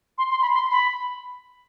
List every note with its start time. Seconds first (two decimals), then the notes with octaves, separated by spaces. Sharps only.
0.18 C6
0.31 C6
0.42 B5
0.53 C6
0.71 B5